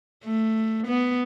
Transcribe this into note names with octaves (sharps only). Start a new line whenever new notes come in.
A3
B3